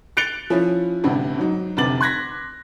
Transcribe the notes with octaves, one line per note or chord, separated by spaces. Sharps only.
F#6 A6 C#7 D7 F7 G7
F3 C#4 E4
A1 D2 G2 C3
G#2 F#3 D#4
F1 D2 C3 D6 A6 F#7
C6 F#6 G#6 A#6 B6